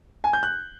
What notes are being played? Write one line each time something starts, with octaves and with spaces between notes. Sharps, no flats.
G#5
G6
F#6